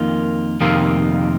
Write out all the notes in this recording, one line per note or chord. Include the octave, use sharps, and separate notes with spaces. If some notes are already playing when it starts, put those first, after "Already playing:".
Already playing: F2 D#3 A#3 F4
F2 C3 D#3 A#3 F4